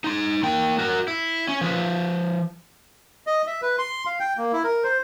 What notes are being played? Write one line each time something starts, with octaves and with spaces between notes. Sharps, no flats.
D#4 C6
A#3 G5
F#4 A#4
E4
C#4
F3 B4
D#5
E5
B4
C6
F5
G5
A#3
E4
A#4
C5